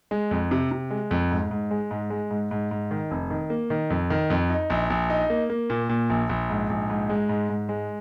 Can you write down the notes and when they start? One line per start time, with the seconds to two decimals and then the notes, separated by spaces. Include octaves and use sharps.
0.11 G#3
0.31 F2
0.51 C3
0.71 C3
0.91 G#3
1.11 F2
1.31 G#2
1.51 G#2
1.71 G#3
1.91 G#2
2.10 G#3
2.30 G#2
2.51 G#2
2.71 G#2
2.91 D#3
3.11 F1
3.30 D#3
3.50 A#3
3.70 D#3
3.90 F2
4.10 D#3
4.30 F2
4.50 D#4
4.70 A#1
4.90 A#1
5.10 D#4
5.30 A#3
5.50 A#3
5.70 A#2
5.89 A#2
6.10 A#1
6.29 A#1
6.50 G#2
6.69 A#1
6.90 G#2
7.09 G#3
7.29 G#2
7.49 G#2
7.69 G#3